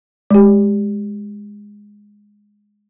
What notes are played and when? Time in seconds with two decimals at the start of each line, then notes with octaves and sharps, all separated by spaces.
0.31 G#3 G4